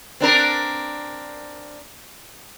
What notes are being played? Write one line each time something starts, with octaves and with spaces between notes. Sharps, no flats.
C4 D4 A#4